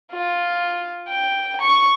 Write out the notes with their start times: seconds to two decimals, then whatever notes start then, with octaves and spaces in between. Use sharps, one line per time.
0.12 F4
1.09 G5
1.62 C#6